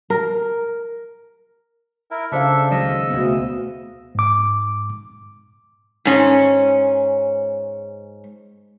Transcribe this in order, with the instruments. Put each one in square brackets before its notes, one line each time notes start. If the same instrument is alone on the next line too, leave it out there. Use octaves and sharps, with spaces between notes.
[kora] A#4
[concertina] E4 A#4
[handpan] C#3 C5 F5 [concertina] D4 A4 E5
[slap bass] C#2 D#3 F#3 [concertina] D#5 E6
[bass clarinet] D2 [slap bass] B2 B3
[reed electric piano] G#2 D6
[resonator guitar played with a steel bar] G#2 C#4